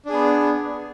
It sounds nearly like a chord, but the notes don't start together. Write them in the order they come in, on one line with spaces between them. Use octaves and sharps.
D4 G#4 B3